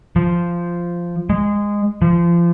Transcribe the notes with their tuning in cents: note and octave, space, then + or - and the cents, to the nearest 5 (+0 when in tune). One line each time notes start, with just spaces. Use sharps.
F3 -10
G#3 -15
F3 -30